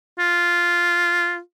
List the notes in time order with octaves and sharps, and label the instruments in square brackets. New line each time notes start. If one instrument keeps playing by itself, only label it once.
[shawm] F4